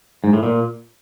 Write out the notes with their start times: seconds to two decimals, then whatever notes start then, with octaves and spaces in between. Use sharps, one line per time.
0.24 G#2
0.33 A2
0.43 A#2